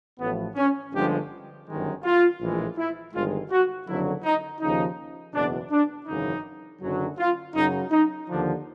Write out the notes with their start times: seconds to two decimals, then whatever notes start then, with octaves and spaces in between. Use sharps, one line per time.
0.19 A1 A2 F3 B3
0.56 C#4
0.92 G1 G2 D3 F3 G#3 G4
1.66 G1 F#2 D#3 G#3
2.03 F4
2.40 A#1 A2 E3 G#3
2.77 E4
3.13 G1 G2 D#3 G#3 F4
3.51 F#4
3.87 F#1 F2 D3 F#3 E4
4.24 D#4
4.61 D#2 C#3 F3 D#4
5.34 F#1 E2 B2 D4
5.71 D4
6.07 G#1 F#2 C#3 E3 D#4
6.81 F#1 F#2 D3 F#3
7.18 F4
7.55 F#2 C#3 F#3 D#4
7.91 D#4
8.28 D#2 D3 F3 D4